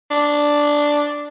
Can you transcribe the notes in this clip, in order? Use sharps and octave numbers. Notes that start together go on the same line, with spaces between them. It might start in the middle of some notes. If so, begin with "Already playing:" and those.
D4